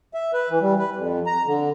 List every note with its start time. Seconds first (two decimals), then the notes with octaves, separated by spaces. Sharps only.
0.14 E5
0.33 B4
0.49 E3
0.61 G3
0.79 B4
0.96 F2
1.26 A#5
1.45 D3